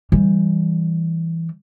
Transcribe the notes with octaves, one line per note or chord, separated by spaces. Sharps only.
E3 G3